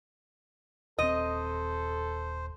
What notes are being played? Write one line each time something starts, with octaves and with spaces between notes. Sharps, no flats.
D#1 C4 A4 C5 D#5